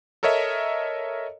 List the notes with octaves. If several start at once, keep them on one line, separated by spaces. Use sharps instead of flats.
A4 A#4 C#5 D#5 E5